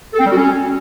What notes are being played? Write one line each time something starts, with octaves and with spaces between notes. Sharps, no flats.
A4
C4
G3
F#4
C#4